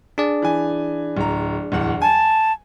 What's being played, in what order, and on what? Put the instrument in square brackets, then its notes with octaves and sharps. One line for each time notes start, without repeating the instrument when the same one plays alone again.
[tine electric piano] D4 G#4 D5
[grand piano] E3 G#5
D1 A#5
D1 E2 F#5
[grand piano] G#5 [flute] A5